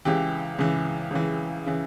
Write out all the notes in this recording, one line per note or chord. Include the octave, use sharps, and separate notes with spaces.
C#2 C#3 E3 G4
C#2 C#3 E3
C#2 C#3 E3
C#3 E3